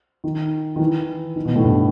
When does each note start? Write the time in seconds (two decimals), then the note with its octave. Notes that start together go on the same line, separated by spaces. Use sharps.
0.24 D#3
0.76 D#3
0.79 E3
1.36 D#3
1.45 B2
1.55 A2
1.65 G2